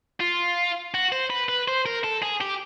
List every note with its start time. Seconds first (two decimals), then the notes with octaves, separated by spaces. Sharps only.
0.20 F4
0.94 F#4
1.12 C5
1.30 B4
1.49 B4
1.68 C5
1.86 A#4
2.04 A4
2.22 G#4
2.41 G4